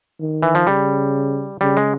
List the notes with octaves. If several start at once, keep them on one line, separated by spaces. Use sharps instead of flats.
D#3
E3
F3
C#3 G3
C#3 G3
G#3